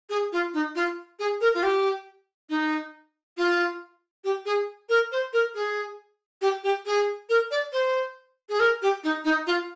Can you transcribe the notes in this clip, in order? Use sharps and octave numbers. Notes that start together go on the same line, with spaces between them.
G#4
F4
D#4
F4
G#4
A#4
F4
G4
D#4
F4
G4
G#4
A#4
C5
A#4
G#4
G4
G4
G#4
A#4
D5
C5
G#4
A#4
G4
D#4
D#4
F4